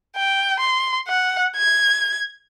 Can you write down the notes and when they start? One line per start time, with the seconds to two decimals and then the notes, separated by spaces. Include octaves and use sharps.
0.17 G5
0.59 C6
1.08 F#5
1.56 G#6